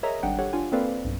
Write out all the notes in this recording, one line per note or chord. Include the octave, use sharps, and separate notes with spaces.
G#4 A#4 C#5 D#5 E5 A#5
G#1 G3 D4 F#5 G5
G4 A4 C#5 F#5
D4 F4 G#5
A#3 C4 A4 B4 D5 F5
B1 G2